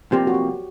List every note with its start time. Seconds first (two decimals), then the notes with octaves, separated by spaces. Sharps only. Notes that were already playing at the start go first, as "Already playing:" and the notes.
0.12 C3 F3 A#3 G4
0.27 F#4
0.34 G4